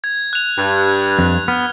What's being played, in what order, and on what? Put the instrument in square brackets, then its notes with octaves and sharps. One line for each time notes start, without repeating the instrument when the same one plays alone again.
[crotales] G#6
F#6 F7
[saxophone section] G2
[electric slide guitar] F2
[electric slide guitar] B3 [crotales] F6